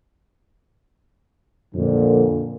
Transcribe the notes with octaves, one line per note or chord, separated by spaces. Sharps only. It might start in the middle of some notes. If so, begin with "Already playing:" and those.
F2 A#2 D3